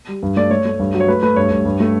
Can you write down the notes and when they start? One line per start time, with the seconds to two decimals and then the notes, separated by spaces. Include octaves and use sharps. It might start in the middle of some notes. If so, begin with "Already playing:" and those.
0.08 G3
0.23 G2
0.36 A3 D5
0.50 A3 C#5
0.65 A3
0.79 G2
0.94 F#3
1.00 C#5
1.08 A3 B4
1.23 A3 B4
1.36 G2 C#5
1.51 G2
1.65 G2
1.80 A3